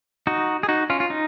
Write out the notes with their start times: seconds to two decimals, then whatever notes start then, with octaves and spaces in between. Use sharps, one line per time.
0.27 D#4 F#4
0.63 G#4
0.69 D#4 F#4
0.90 C#4 F4
1.00 F4
1.10 D#4